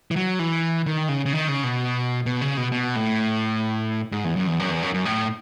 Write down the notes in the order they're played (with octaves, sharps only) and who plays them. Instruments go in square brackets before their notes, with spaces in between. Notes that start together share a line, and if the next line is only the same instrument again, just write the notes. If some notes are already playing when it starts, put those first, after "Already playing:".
[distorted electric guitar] E3
F#3
E3
D#3
C#3
C#3
D#3
C#3
B2
B2
C#3
B2
B2
A2
G#2
E2
F#2
E2
F#2
E2
F#2
F#2
A2